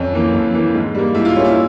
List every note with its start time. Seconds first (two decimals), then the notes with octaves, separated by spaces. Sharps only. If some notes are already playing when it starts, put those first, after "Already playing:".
Already playing: F2 C#4
0.13 E3 A#3
0.33 F2
0.54 E3 A#3
0.74 G#2
0.95 G3 A#3
1.15 G#2 E4
1.25 F4
1.35 G3 A#3 C#4
1.45 E4